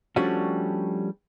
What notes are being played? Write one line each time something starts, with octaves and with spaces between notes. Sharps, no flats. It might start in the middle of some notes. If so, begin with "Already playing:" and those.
F3 G3 A3 C#4 D4 F#4